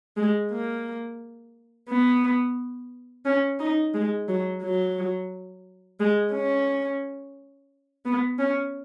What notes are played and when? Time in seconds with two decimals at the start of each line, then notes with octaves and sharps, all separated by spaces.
0.17 G#3
0.51 A#3
1.89 B3
3.25 C#4
3.60 D#4
3.94 G#3
4.29 F#3
4.63 F#3
6.00 G#3
6.34 C#4
8.06 B3
8.39 C#4